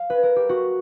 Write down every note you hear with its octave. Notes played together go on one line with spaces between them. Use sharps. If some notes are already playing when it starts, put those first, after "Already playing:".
Already playing: F5
B4
A#4
G4
F#4